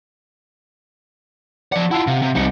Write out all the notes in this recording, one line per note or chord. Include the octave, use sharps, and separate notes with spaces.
F3 D5 F#5
E4 F4 F#5 A5 E6
C3 F5 F#5
C3
C2 C4 D#4 C#7